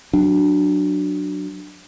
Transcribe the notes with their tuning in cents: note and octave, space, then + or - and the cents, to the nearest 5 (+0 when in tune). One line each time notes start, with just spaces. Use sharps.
F#3 +0 D4 +10